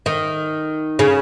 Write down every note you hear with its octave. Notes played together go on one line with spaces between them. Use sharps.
D#3
C#3